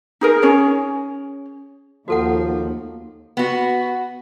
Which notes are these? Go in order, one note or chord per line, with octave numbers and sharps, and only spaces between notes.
D#4 G#4 A#4
C#4 G#4 C#5
D#2 F3 F#4 A4 F#5
B3 F#4